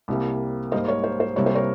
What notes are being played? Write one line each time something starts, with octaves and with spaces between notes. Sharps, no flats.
C2 C3 G3 A#3
G#2 G3 A#3 C5 D#5
A#4 C#5
C5
C5
C2 C3 G3 A#3 C#5
C5
A#4 C#5